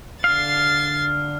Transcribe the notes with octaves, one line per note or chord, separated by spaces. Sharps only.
D3 F5 F6 A6 C7